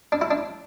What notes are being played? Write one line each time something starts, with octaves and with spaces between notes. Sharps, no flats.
D4
E4
D4